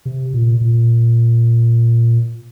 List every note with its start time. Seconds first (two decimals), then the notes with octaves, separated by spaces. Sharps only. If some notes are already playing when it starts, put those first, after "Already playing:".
0.05 C3
0.33 A#2
0.61 A#2